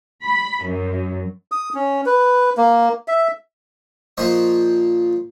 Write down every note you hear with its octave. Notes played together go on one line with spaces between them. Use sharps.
B5
F#2
D#6
C#4
B4
A#3
E5
A#2 F3 C5 D#5 C6 C#6